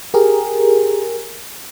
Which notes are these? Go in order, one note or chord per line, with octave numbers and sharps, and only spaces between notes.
G4 G#4 A#4